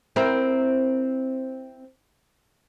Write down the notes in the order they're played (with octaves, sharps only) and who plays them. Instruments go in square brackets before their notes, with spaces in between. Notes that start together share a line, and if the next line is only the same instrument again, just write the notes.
[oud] C4 E4 A#4